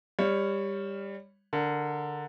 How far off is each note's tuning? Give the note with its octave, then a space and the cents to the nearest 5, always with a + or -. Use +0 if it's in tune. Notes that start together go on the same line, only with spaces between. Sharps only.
G3 +20 C#5 +0
D3 +0 A#4 -15